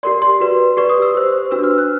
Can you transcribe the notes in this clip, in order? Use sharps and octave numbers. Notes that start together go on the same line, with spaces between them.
G4 A#4 D5 C6
C6
F#4 B4 D5
G4 B4 D5 C#6
D#6
E6
G4 C5
D4 F#4 B4 E6
F6
F#6